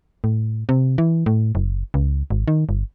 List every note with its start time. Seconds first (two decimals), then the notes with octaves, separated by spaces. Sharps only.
0.24 A2
0.69 C3
0.98 E3
1.26 A2
1.55 F#1
1.94 C#2
2.30 G#1
2.48 D#3
2.69 G1